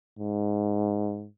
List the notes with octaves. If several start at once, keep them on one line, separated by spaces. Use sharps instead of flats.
G#2